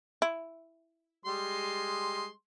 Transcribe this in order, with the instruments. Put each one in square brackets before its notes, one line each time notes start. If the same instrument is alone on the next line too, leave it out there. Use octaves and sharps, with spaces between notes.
[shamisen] E4
[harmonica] G3 G#3 C6